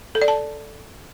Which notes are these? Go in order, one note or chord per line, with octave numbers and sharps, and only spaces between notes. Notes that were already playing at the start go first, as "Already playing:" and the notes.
A4
D5
A5